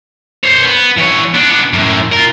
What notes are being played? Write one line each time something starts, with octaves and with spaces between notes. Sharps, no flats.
C5 C#5
B3
E3 C#5
B3 D4
F#2 A2
F4 A#4